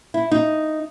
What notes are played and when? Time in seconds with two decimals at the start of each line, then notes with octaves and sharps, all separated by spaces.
0.14 E4
0.32 D#4